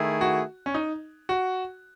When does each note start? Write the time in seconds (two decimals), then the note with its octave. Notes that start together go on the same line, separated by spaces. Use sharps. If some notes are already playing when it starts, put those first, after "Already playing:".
Already playing: D#3 A3 E4 G#4
0.21 F#4
0.66 C#4
0.74 D#4
1.29 F#4